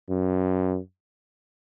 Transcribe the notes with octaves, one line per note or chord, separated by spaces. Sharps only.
F#2